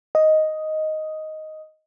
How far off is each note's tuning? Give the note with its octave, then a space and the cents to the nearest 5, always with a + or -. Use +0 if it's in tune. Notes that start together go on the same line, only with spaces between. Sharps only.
D#5 +5